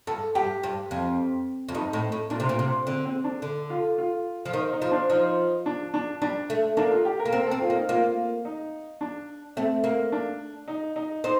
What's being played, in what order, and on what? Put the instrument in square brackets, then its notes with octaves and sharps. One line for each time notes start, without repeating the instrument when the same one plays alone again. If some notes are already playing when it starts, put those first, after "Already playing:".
[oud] G2 [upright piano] A4
[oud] G2 [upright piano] G4
[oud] G2
F2
F2
[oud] G2 [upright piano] D#4
[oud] A2
A2
[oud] A#2 [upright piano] D4
[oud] C3
A#2
C3
[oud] D3 [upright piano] C4
[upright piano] C4
D4
[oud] D3
[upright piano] F4
F4
[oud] F3
[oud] D#3 [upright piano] D#4
[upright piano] D#4
[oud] F3
[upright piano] D4
[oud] F3 [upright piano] D#4
[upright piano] D4
D4
[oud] G3 [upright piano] D4
[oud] A3
[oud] A#3 [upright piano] D4
[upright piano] F4
G4
A#4
[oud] A#3
[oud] C4 [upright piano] A#4
[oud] C4 [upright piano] A4
[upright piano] F4
[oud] A#3
[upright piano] D#4
[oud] A#3 [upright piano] F4
[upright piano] D#4
D4
[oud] A3 [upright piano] C4
[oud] A#3
[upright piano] D4
D#4
D#4
[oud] C4 [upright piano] D#4